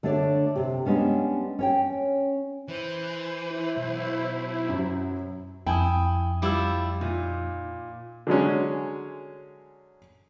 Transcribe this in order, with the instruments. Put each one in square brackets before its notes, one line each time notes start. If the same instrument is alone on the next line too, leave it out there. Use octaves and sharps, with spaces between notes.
[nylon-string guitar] D3 A3 D4 A4 C#5 D5
C3 G4
G3 G#3 B3 C#4 D4
C#4 C#5 G5
[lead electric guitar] E3 [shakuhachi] C5
[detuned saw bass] E4
[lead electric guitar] B1
[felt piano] F#2 F#3
[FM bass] F2 [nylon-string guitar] E4 [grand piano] G5 G#5 D#6
[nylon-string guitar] G3 E4 F4 [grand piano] D6 E6
[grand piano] A#2 [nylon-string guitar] D#4
[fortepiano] D3 F#3 G#3 C#4